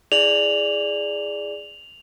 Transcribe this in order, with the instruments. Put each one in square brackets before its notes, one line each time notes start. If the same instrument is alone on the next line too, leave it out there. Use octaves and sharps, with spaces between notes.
[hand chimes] E4 G#4 D5 [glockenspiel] F7 F#7